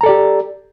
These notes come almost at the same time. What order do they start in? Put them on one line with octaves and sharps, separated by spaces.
A#5 A4 D5 G4